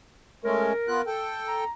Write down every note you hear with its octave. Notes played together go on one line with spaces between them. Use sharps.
G#3 A3 C#4 A#4
B3 F4 F#6
A4 G5
A#5